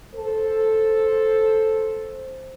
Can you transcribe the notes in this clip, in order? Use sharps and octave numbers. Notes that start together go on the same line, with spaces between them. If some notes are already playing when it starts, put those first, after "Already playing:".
A4 C5